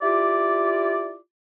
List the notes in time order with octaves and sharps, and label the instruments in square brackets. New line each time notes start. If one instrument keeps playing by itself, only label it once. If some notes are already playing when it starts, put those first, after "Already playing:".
[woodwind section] E4 F4 G4 D5